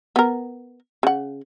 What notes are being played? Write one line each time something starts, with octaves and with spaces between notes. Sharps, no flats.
B3 A#4
C#3 F#5